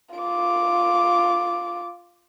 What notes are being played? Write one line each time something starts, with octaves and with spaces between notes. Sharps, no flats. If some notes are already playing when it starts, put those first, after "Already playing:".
F4 D6